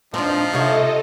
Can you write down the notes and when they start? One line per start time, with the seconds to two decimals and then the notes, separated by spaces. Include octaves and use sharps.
0.14 F3 C4 D4 D#4
0.54 C3 F4 A4 C#5 D#5